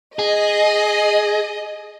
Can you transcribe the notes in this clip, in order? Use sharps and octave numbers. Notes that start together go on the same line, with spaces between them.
G#4 D#5